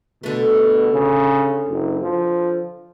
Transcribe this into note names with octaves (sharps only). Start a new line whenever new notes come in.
B2 D3 A3
C#3
F#1
F3